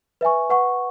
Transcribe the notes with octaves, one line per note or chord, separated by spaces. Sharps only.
B4 E5 G#5 C#6
B4 F#5 C#6